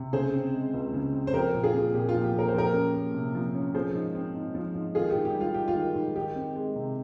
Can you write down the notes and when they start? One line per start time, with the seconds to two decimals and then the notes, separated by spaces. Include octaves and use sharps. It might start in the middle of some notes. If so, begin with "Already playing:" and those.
Already playing: C3
0.13 C#3 G#4 C5
0.34 C4
0.53 G#3
0.73 C#2
0.94 C#3
1.14 C4
1.27 C5
1.34 F3 G4 A#4
1.54 A#2
1.64 F4 G#4
1.74 C4
1.94 A#2 G4
2.09 F4
2.14 F3
2.24 G4
2.34 A#2 A#4
2.48 C5
2.54 F3 G4 A#4
2.74 C#4
2.94 A#3
3.14 C3
3.35 F3
3.55 C#4
3.74 F3 G#4 C5
3.94 G#2
4.15 C4
4.35 G#2
4.55 F3
4.75 G#2
4.95 D#3 F4 G#4
5.11 G#2 G4
5.25 G4
5.35 G3
5.41 F4
5.54 G#2 G4
5.68 F4
5.75 D#3
5.95 G#2
6.15 D#3 G4
6.35 C4
6.56 G#3
6.76 C3